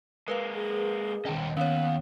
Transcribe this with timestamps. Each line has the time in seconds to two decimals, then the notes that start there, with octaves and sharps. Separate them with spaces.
0.28 G#3 A#3 A#4 B4 F5
0.54 G#4
1.25 D#2 C#4 D#5 G5 A5
1.57 D#2 B3 C#4 C#5 F5